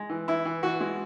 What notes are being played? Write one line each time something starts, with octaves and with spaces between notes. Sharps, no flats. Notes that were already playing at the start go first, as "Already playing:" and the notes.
Already playing: G#3
E3
E3 E4
E3
E3 F#4
G#3